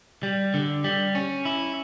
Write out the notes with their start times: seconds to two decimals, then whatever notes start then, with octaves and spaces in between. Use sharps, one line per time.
0.23 G3
0.54 D3
0.84 G3
1.15 C#4
1.45 E4